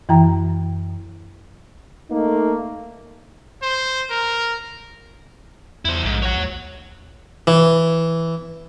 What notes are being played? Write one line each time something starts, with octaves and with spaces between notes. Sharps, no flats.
F#2 E3 E4 G5 A#5
A3 A#3 D#4
C5
A#4
E2 E4 C5
A#1 G#2
C#5 F#5
D#2
E3